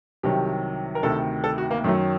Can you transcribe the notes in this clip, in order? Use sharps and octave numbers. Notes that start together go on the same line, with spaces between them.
C2 C3 D#3 F#3 G4
A#4
D2 C3 D#3 A4
A4
F#4
A#3
F#2 D#3 F#3 A3